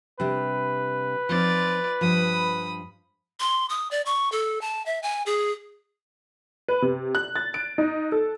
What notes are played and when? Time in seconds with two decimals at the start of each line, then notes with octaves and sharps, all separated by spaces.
0.20 C3 G3 D4 B4
1.29 F3 C4 D#4 F4 D5
2.01 G2 F3 B5 D#6
3.40 C6
3.69 D#6
3.91 D5
4.06 C#6
4.32 A4
4.61 A5
4.86 E5
5.03 G#5
5.26 G#4
6.68 B4
6.82 C3
7.15 F#6
7.36 A6
7.54 D7
7.78 D#4
8.12 A4